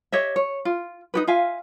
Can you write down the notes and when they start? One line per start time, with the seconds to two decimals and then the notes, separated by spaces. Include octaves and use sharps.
0.12 G4 C#5 D#5 E5
0.36 C#5
0.65 F4
1.14 D#4 G4 B4
1.27 F4 E5 F5 G#5